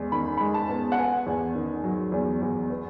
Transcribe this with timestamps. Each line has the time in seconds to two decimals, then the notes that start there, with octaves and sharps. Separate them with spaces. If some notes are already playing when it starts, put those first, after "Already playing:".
Already playing: E2 G#3
0.12 D#3 B5
0.37 B5
0.41 G#3
0.54 A5
0.69 B3
0.92 F#5
0.98 B3 G#5
1.27 E2
1.55 D#3
1.84 F#3
2.12 E2
2.42 E2
2.70 B3